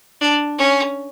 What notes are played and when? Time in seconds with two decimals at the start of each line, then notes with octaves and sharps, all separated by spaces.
0.21 D4
0.58 C#4